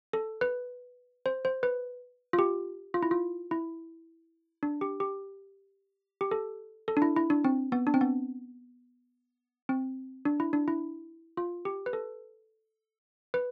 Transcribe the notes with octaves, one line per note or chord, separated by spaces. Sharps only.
A4
B4
C5
C5
B4
F4
G4
F4
E4
F4
E4
D4
G4
G4
G4
A4
A4
D4
E4
E4
D4
C4
B3
D4
C4
B3
C4
D4
E4
D4
E4
F4
G4
B4
A4
B4